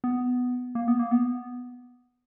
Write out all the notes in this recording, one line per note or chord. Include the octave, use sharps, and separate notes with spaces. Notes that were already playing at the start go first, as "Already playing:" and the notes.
B3
A#3
B3
A#3
B3